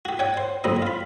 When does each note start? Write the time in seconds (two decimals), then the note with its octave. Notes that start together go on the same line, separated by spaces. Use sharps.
0.05 F#4 G4
0.19 C#5 D5 F#5 G5
0.37 C5
0.64 B1 F#2 A#2 C4 D#5
0.82 F4 B5